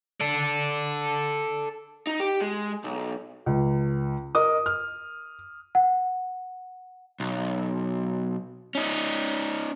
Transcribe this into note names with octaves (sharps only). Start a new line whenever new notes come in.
A4 D5
D#4
G4
G#3
B1
C#2
A#4 D#5 D#6
F6
F#5
B1
C#4 D#4